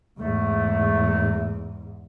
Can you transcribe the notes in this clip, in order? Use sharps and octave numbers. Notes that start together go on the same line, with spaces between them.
E2 G#2 A3